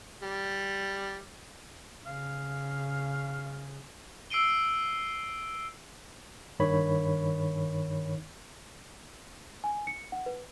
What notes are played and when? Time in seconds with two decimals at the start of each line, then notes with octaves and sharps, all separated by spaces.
0.22 G3
2.07 C#3 F5
4.30 E6 C7 D7 D#7 G7
6.60 G2 D#3 C#5 B5
9.64 G#5
9.87 C#7
10.12 F#5
10.26 B4